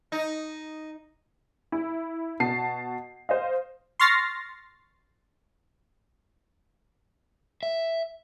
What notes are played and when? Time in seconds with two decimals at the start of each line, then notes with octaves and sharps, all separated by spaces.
0.12 D#4
1.72 E4
2.40 B2 A5 C7
3.29 C5 D#5 F5
4.00 C6 C#6 F6 A6 A#6 C7
7.63 E5